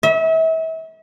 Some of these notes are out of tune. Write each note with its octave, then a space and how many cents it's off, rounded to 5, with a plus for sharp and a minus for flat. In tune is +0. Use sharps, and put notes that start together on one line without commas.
E5 -35